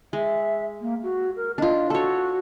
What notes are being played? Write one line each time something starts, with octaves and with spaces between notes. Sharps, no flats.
G#3 E5
A#3
F#4
A#4
D4 F4 D#5
F#4 A4 C#5